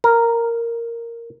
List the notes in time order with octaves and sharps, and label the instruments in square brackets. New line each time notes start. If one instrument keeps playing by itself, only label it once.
[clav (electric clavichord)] A#4